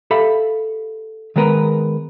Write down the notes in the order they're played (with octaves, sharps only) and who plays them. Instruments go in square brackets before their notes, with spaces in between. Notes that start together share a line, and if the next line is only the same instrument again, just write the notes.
[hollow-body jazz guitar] G4 A4 E5 F5 B5
D#3 G#3 B3 A#4 B4